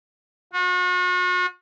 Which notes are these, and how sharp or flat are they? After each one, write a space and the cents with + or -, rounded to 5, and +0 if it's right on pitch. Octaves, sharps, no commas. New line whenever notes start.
F#4 -40